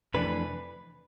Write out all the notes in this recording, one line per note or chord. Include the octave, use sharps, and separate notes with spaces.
F2 C3 E3 A3 D4 B4